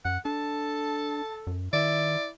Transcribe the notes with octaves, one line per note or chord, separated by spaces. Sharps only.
F#2 F#5
D4 A4 A5
F#2
D#3 E4 D5